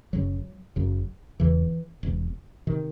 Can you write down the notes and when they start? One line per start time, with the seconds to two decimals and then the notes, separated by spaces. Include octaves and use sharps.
0.13 F#1 F#2 C#3 F#3
0.76 F#1 F#2 C#3
1.39 E1 E2 C#3 E3
2.03 E1 E2 C3
2.67 C3 D#3